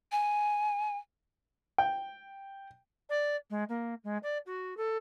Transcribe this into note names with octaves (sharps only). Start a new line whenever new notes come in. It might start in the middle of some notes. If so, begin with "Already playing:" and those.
G#5
G5
D5
G#3
A#3
G#3
D5
F#4
A4